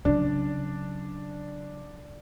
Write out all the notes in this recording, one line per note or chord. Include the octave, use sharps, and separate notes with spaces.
C#3 F#3 D4